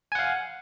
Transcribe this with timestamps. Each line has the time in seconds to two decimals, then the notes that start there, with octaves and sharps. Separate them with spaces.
0.12 G#5
0.15 F#5
0.19 F5